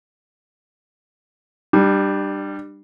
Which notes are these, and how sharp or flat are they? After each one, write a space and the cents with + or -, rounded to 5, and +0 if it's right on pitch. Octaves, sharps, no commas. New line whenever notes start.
G3 +0 D4 +30